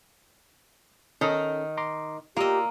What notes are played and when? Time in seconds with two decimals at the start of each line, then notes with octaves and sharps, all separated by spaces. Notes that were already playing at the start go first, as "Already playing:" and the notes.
1.21 D#3 C#4 D#4 A4
1.77 A#5 C6 D6
2.37 A#3 F4 G4 A#4 D#5 D#6 E6